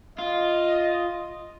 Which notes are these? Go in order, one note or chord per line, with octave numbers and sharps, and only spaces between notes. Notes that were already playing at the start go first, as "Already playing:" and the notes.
F4 D#5